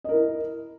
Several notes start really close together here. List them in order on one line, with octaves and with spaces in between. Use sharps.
D#5 A#4 E4